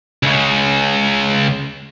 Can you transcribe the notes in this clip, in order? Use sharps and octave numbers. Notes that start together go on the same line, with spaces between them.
C#2 C#3